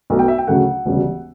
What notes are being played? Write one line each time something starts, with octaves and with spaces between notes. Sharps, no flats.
B1 B2 A3
G5
E5
G5
D2 C#3 F#3 A3 F#5
E1 D2 C#3 G3